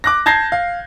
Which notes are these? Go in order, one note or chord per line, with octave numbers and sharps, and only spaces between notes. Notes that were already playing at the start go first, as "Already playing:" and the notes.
D6 F#6 A#6
A5 G6 G#6 A#6 C7
F5